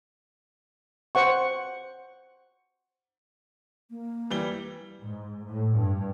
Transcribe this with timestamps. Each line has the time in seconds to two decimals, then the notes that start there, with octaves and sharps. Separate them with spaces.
1.15 C5 F#5 C#6
3.90 A#3
4.30 E3 G3 G7
5.01 G#2
5.45 A2
5.75 G2